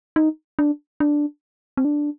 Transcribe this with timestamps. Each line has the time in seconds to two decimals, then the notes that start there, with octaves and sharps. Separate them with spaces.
0.16 D#4
0.59 D4
1.00 D4
1.77 C4
1.85 D4